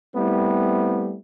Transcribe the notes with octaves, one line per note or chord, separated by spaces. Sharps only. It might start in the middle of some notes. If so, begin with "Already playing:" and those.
G3 A3 B3 C4 E4